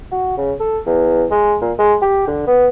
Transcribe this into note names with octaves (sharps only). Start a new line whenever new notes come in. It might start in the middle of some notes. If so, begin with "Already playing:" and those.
F#4
C#3
A4
E2
G#3
A#2
G#3
G4
D3
B3